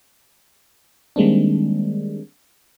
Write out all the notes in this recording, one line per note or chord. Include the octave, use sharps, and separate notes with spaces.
D#3 G3 G#3 A#3 C4 D4